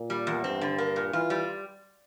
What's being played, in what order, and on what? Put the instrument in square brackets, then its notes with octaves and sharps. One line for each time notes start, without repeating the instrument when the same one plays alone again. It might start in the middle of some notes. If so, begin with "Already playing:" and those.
Already playing: [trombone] A#2
[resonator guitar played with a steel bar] G3
E2
[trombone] G2 [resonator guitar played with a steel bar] C4
[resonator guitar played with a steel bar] D3
A#3
A#2
[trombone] E3 [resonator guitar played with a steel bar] F4
[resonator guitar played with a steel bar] G3